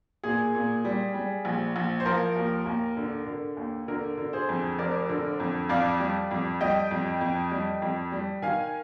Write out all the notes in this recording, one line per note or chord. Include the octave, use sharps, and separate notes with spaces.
A#2 G#4
A#2
G3
G3
A#1
A#1
C5
F3 A#4
D#2
D#2
D3
D3
D#2
D3 A#4
D3
G#4 C5
F2
F1 A#4 D5
D3
F2
F2 D5 F5
G3
F2
G3 D#5 G5
F2
F2
G3
F2
G3
D#3 F5 G#5